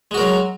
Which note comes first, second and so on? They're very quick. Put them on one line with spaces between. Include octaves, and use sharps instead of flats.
G#3 F#4 A#4 F#3